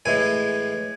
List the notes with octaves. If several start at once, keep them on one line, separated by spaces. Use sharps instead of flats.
A2 E3 G#3 G#5